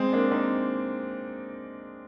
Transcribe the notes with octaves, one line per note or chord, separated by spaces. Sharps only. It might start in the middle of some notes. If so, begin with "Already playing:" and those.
Already playing: G#3 C4
A#3 D4
C4 D#4